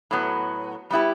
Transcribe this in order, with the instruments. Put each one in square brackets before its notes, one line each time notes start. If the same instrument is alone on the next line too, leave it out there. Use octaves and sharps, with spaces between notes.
[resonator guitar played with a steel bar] A2 F#3 B3
G3 B3 E4 G4